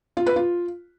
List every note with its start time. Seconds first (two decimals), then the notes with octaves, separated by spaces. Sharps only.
0.17 F4
0.26 B4
0.36 F4